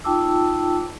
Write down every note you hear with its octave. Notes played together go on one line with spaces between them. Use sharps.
D#4 F4 G5 A5 D6 E6